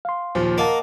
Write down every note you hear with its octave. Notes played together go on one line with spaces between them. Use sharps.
F5 C6
D#2 A#2 F3
A#3 A#4 D#5 F#5 A5